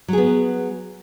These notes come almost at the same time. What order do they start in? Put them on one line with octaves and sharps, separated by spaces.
F#3 G#4 B3